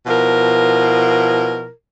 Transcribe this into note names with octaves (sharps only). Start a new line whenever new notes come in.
B2 F3 E4 A#4